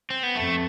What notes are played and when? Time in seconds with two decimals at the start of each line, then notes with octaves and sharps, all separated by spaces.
0.10 C4
0.23 B3
0.35 F2 A3